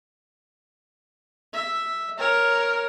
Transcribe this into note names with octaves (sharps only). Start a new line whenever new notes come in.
E5
A#4 C#5